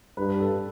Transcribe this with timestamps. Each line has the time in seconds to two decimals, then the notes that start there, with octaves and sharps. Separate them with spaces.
0.17 G2 B4
0.40 A4